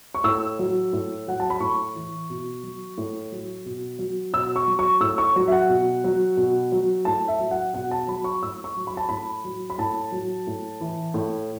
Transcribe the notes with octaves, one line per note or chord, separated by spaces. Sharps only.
C#6
A2 E6
F#3
A2
F#3 F#5
A5
B5
A2 C#6
E3
B2
F#3
A2
F#3
B2
F#3
B2 E6
C#6
F#3
C#6
A2 E6
C#6
F#3
E5
F#5
B2
F#3
B2
F#3
A2 A5
E5
F#3
F#5
B2 F#5
A5
F#3 B5
C#6
A2 E6
C#6
F#3
B5
A5
A2 B5
F#3
B5
A2 A5
F#3
A2
E3
A2